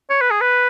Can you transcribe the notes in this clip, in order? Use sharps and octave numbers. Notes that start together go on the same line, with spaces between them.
C#5
B4
G#4
B4